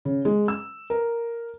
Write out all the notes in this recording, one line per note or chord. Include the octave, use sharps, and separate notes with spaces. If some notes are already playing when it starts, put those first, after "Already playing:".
C#3
G#3
E6
A#4